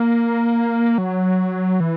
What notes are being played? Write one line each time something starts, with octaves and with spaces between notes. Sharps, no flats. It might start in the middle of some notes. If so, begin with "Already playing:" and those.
Already playing: A#3
F#3
E3